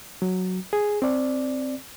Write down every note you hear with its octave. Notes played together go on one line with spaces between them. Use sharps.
F#3
G#4
C4 D5